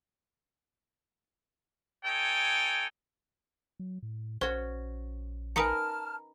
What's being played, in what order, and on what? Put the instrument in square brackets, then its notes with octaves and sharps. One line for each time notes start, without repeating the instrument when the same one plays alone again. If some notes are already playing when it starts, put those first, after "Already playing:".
[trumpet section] D#4 A4 C#5 G5 G#5
[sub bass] F#3
A2
[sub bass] A#1 [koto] C#4 F#4 [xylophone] C5
[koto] D#4 A#4 B4 [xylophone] G#5 D#6 C#7 [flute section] A5 F6